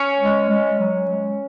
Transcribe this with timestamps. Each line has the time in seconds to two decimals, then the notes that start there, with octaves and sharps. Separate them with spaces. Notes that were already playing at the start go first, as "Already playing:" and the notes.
Already playing: C#4
0.20 G#3
0.50 G#3
0.80 F#3
1.10 G#3